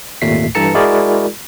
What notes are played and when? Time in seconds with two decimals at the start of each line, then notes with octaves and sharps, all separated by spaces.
0.22 G#1 D#2 A#2 A3 B6 C7
0.55 G2 E3 A4 A5 A#5 C#7
0.74 G#3 E4 F#4 G#4 A#4 D5